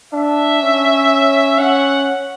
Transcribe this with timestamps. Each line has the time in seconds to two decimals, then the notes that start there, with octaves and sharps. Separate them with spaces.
0.13 D4 E5
0.62 C#4
1.59 C#4 F#5